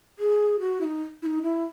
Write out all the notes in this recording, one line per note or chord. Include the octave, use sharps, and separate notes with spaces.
G#4
F#4
E4
D#4
E4
D#4
E4